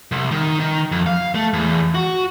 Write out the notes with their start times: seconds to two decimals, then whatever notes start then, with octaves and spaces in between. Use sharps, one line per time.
0.12 C2
0.31 D#3
0.60 D#3
0.92 F2
1.06 F5
1.35 A3
1.53 E2
1.95 F#4